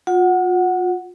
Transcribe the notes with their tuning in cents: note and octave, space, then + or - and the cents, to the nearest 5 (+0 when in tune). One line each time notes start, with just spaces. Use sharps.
F4 +35 F#5 +0